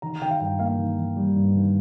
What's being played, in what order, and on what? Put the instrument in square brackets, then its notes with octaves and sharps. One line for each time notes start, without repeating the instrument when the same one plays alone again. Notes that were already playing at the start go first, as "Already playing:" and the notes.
[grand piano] D#3 A#5
D#3 G5
F5
G2 G5
A#3 F5
D#3
D#3
G3
G2
D#3